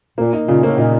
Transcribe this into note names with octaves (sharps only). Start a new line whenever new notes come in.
A#2 A#3
D#4
A#2 C#3
A2 A#3
A#2 D#4